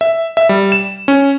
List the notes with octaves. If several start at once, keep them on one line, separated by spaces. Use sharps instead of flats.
E5
E5
G3
E7
C#4